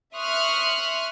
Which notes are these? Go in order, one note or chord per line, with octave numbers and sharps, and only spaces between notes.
E5 C6 C#6 D#6 F6 F#6